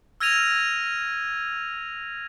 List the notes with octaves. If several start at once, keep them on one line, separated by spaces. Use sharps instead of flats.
E6 F6 G#6 A#6 D#7 F7